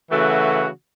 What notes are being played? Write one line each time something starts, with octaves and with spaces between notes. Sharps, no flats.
C#3 E3 A3 F#4